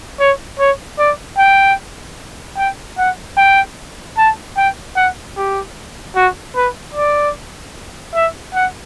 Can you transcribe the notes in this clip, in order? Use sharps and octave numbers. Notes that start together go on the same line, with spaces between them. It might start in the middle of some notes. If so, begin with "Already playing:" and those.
C#5
C#5
D5
G5
G5
F#5
G5
A5
G5
F#5
G4
F#4
B4
D5
E5
F#5